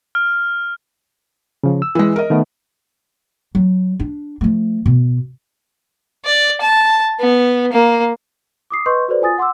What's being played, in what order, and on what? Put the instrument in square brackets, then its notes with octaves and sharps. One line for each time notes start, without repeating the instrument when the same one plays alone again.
[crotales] F6
[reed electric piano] C#3 F3
E6
[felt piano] E3 G#3
A#4 D#5
[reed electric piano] D#3 A3 B3
[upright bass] F#3
D4
F3 A3
B2
[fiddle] D5
A5
B3
A#3
[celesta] D6 D#6 C7
B4 D#5 C6 C#6 G6
F#4 A4 B4 C5 D5
F4 G#5 D#6 A6
F#5 C6 D6 E6